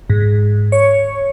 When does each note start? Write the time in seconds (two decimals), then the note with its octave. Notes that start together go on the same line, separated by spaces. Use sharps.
0.10 G#2
0.72 C#5